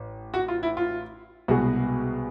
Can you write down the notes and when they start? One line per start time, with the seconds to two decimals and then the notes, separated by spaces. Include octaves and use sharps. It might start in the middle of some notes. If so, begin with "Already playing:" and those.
Already playing: A1
0.34 F#4
0.48 F4
0.63 E4
0.77 F4
1.48 C2 B2 G#3 B3 F#4